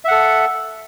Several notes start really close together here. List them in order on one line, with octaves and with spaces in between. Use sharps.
E5 F#5 A4